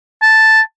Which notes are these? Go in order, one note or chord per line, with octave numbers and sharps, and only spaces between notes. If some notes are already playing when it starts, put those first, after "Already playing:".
A5